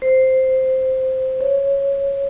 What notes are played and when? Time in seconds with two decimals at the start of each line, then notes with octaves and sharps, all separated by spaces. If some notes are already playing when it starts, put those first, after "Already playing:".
0.02 C5
1.41 C#5